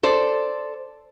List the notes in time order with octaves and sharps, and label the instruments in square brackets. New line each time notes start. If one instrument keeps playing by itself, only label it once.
[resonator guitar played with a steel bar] A4 C5 D5